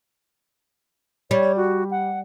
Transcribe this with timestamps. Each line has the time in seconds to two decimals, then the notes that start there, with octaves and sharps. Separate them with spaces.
1.31 G3 C#5
1.57 F#4
1.91 F#5